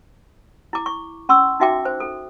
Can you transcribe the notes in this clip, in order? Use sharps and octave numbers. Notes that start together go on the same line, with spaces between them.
E4 D6
C#6
C#4 C6 C#6 E6
D#4 F#4 E5 G5 D6
C5
A4